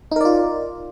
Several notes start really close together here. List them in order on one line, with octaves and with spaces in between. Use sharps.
D#4 A#4 D5 F4